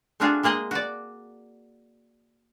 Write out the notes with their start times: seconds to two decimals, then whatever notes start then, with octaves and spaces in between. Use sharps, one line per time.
0.20 A3 C4 D4 F4 F#4 G#4
0.43 G#3 A#3 G#4 D#5
0.71 F#4 D5